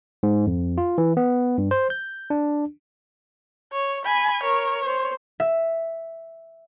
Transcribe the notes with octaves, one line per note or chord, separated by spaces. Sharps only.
G#2
F2
F4
E3
B3
G2
C5
G6
D4
C#5
G#5 B5
A#4 C#5
C5
E5